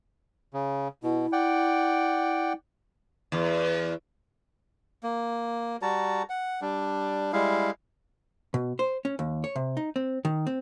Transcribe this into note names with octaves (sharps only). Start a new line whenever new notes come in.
C#3
B2 E4
D5 F#5 G5
E2
A#3
G3 F#4 A5 A#5
F#5
G3 D4
G3 G#3 E4 F5
B2
C5
C#4
D#2
C#5
C3
D#4
C4
D#3
C4